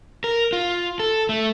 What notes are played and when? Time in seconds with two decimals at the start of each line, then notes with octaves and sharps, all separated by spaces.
0.24 A#4
0.53 F4
1.00 A4
1.29 A3